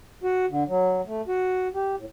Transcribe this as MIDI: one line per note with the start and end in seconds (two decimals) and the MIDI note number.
0.23 0.45 66
0.49 0.64 50
0.68 1.01 54
1.06 1.22 57
1.28 1.68 66
1.74 1.95 67
1.97 2.05 45